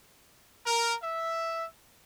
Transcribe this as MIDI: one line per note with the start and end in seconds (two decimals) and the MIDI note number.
0.65 0.93 70
1.02 1.65 76